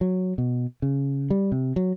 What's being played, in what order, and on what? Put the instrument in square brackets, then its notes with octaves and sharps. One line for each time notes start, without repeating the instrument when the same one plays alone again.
[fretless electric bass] F#3
B2
C#3
G3
C3
F#3